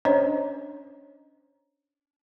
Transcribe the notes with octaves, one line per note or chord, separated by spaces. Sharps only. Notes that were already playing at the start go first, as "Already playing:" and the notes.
C#4 D4 C5 C#5 D#5